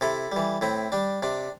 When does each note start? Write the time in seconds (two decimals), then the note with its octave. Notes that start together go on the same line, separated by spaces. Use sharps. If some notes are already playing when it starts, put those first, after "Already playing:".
0.01 C3 E4 A4
0.32 E3 G3
0.61 A2 C4 E4
0.92 G3 D4
1.23 C3 D4